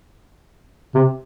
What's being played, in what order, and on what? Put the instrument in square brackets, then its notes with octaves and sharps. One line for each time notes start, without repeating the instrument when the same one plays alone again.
[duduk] C3